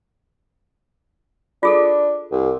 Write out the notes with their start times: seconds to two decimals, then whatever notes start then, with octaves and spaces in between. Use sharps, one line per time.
1.63 D4 F4 G#4 A4
2.32 C2